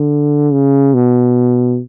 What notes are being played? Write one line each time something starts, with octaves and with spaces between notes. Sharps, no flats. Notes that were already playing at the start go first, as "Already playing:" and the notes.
Already playing: D3
C#3
B2